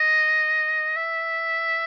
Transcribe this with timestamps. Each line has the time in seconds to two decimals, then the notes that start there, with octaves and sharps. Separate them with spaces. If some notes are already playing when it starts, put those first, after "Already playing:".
Already playing: D#5
0.96 E5